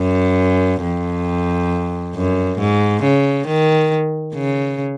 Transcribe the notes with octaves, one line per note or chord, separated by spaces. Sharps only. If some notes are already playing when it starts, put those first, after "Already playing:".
Already playing: F#2
F2
F#2
G#2
C#3
D#3
C#3